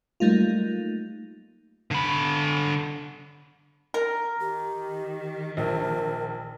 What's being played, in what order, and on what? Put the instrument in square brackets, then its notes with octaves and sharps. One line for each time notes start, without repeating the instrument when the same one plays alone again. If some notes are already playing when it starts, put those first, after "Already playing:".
[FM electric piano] F#3 G3 A3 A#3 D#4 F4
[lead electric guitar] D3 B5
[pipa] A#4
[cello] D#3 [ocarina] G4
[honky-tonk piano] A#1 [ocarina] A#4